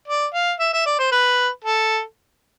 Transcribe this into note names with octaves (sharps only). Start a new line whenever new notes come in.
D5
F5
E5
E5
D5
C5
B4
A4